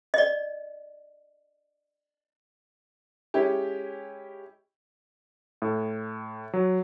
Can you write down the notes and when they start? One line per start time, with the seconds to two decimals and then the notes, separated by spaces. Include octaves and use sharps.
0.14 D5 D#5
3.34 G#3 C#4 E4 G4
5.62 A2
6.53 F#3